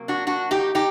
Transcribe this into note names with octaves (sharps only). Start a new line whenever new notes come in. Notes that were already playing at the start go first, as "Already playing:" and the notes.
Already playing: C3 F#3 A#3
D4 F#4
D4 F#4
D#4 G4
D#4 G4